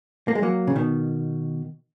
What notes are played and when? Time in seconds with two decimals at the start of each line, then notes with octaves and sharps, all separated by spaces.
0.28 A#3
0.35 G#3
0.42 F#3 A#3
0.67 C#3
0.76 B2 D#3